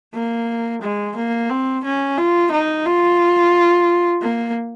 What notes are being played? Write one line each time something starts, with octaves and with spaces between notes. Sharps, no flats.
A#3
G#3
A#3
C4
C#4
F4
D#4
F4
A#3